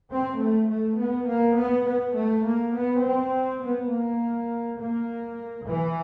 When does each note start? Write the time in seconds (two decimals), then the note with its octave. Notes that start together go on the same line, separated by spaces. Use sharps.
0.11 C4
0.40 A3
0.69 A3
0.99 B3
1.28 A#3
1.56 B3
1.87 B3
2.16 A3
2.45 A#3
2.74 B3
3.03 C4
3.62 B3
3.90 A#3
4.79 A#3
5.67 E3